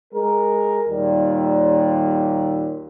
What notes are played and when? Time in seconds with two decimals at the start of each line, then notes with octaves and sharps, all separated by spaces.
0.14 G#3 A#4
0.89 D#2 A#2 G3